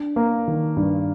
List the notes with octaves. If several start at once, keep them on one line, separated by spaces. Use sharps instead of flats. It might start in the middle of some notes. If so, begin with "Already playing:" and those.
Already playing: D4
A#3
D#3
G2